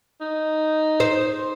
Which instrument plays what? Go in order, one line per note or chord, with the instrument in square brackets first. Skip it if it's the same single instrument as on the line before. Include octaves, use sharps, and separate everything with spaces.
[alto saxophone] D#4
[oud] C5